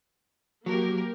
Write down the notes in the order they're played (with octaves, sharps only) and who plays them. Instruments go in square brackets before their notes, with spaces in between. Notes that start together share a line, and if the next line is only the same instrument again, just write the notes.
[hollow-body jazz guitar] F#3 [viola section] A#3 G4 [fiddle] A#4